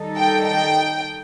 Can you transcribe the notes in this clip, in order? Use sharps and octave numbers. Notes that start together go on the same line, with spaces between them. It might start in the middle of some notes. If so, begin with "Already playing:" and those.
Already playing: D#3 G3 D#4 A4
G5
G5